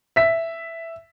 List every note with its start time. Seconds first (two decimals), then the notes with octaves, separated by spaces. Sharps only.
0.16 E5 B6